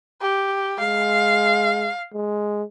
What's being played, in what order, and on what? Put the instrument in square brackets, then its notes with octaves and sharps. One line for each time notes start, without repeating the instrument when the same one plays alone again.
[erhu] G4
[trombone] G#3 [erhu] F5
[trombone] G#3